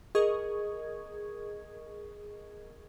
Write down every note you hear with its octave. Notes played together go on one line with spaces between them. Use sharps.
G#4 A#4 D#5 C#6 D#6 G#6